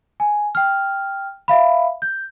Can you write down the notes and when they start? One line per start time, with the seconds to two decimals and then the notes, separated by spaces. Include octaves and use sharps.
0.20 G#5
0.55 G5 F6
1.48 E5 F5 B5
2.02 G6